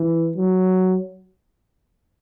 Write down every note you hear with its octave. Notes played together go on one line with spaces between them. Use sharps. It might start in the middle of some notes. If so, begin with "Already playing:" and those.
Already playing: E3
F#3